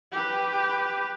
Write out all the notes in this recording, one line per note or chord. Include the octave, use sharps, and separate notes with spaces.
G4 B4